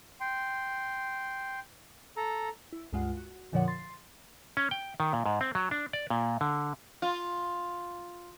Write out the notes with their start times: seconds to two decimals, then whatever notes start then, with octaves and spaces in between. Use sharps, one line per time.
0.20 G5 C6
2.17 A4 A#5
2.73 E4
2.93 C#2 G2 G#3 F4 F#5
3.17 F#4
3.52 F2 A#2 D3 F3 C#5 F#5
3.68 C6 A6 C7
4.57 C#4
4.71 G5
5.00 D#3
5.13 A#2
5.26 G#2
5.41 C4
5.55 F#3
5.71 D4
5.93 D5
6.10 A#2
6.41 D3
7.02 F4